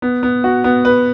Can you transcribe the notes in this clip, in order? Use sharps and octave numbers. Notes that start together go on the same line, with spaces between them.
B3
B3
F#4
B3
B4